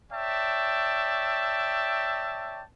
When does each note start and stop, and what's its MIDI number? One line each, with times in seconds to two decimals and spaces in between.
0.12 2.62 73
0.12 2.62 74
0.12 2.62 76
0.12 2.62 79
0.12 2.62 81